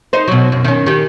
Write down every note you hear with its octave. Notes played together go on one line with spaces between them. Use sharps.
D#4 C5
B2 F#3
F#2
D#3 C#4
D#3 G4